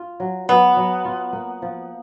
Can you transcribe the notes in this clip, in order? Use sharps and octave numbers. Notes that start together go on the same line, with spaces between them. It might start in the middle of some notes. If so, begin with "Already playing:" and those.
Already playing: F4
F#3
F#3 B3
F#3
F4
A#3
F3